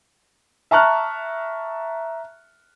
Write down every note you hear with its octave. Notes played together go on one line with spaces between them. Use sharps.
E5 A5 A#5 C#6 F6 F#6